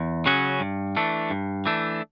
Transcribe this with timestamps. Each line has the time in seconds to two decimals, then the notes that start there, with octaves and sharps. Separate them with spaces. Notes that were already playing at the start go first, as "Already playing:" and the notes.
Already playing: E2
0.26 C#3 F#3 C#4 F#4
0.60 G2
0.97 E3 A3 D4
1.30 G2
1.66 E3 A3 D4